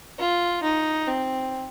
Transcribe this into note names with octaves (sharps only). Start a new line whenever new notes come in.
F4
D#4
C4